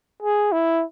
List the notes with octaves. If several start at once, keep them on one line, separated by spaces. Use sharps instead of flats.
G#4
E4